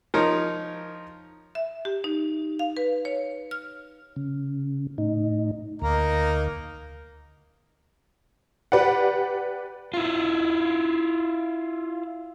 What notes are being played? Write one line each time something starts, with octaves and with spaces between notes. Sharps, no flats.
F3 D#4 A#4 C#5
E5
G4
D#4
F5
B4
C#5
F6
C#3
A2 D#4
D2 A#3 D#4 A#5
G4 B4 D5 F#5
E4 F4